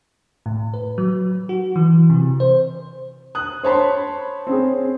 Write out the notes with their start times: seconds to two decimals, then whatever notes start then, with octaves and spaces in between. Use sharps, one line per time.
0.46 A2
0.74 B4
0.98 F#3
1.49 F#4
1.76 E3
2.10 C3
2.40 C5
3.35 D#6 F#6
3.63 C5 C#5 A5 B5 C6
4.47 C4 C#4 G#4